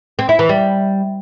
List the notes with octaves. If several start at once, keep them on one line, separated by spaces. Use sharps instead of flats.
C4
E4
E3
G3